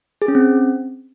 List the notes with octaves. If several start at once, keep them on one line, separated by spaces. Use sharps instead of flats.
G#4
C#4
C4